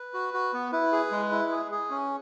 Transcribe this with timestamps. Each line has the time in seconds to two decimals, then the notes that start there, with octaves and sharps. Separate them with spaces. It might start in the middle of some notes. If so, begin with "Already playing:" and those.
Already playing: B4
0.14 F#4
0.34 F#4
0.53 B3
0.72 E4 B4
0.92 G#4
1.11 G#3
1.32 E4
1.52 G#4
1.72 G#4
1.90 C#4